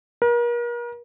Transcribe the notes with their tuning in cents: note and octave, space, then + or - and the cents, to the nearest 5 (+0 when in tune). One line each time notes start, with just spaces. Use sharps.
A#4 +40